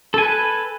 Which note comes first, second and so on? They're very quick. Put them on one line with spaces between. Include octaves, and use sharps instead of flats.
A4 G#5 B4